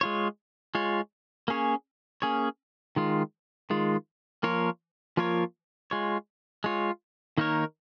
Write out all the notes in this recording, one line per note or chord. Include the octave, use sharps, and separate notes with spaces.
G#3 F4 C#5
G#3 F4 C#5
A#3 C#4 G#4 C#5
A#3 C#4 G#4 C#5
D#3 G#3 F4
D#3 G#3 F4
F3 A#3 F4 A#4 C#5
F3 A#3 F4 A#4 C#5
G#3 F4 C#5
G#3 F4 C#5
D#3 A#3 D#4 A#4 C#5